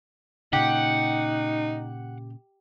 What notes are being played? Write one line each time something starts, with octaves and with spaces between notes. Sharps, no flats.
A#2 C#3 D#4 G4 F#5